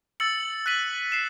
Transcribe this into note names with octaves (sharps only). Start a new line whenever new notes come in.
E6 A6 C#7 F#7
F#6 B6 D#7 F#7
C7 E7